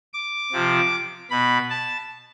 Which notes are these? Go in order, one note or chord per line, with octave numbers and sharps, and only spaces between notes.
D6
C3 F3
B2 B5
A5